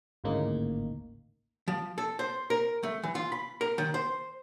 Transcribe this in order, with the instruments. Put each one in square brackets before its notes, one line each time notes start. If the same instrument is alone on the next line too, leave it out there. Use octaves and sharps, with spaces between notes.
[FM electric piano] G#1 D2 A2 C#3 A#3 D#4
[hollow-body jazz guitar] F3
A4
C5
A#4
A3
E3
F4
B5
A#4
D#3
C5